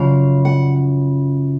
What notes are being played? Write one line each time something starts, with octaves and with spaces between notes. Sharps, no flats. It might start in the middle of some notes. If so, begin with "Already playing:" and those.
Already playing: F#2 C#3 F3 F5
F#5